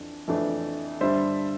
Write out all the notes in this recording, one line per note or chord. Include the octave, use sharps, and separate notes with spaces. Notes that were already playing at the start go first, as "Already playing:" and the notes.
Already playing: F2 E3 D4
F2 E3 A3 D4
G2 D3 G3 D4 C5 E5